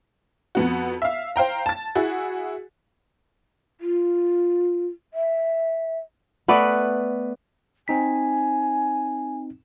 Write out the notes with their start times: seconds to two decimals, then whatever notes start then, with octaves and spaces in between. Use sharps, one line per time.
0.55 F2 B3 F#4
1.02 E5 F5
1.36 C5 F5 G5 A#5
1.66 A5 A6
1.95 E4 F#4 G#4
3.81 F4
5.14 E5
6.48 A3 B3 B4 D5
7.88 C4 D#4 G#5 B6